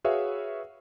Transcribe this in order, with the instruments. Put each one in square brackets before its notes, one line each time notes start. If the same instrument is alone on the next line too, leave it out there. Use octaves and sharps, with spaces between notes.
[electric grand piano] F#4 G#4 B4 C#5 E5 F5